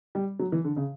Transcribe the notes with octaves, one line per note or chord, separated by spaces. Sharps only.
G3
F#3
E3
D3
C#3